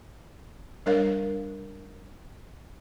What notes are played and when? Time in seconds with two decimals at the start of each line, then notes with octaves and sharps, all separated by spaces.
0.86 G3 D4 A#4 C#5 F5